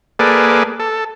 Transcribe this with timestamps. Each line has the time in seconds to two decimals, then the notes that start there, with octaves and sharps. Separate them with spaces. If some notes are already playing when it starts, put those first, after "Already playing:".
0.19 A#3 G#4 A4 B4 D5
0.80 A4